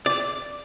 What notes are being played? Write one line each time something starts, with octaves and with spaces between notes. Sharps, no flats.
D5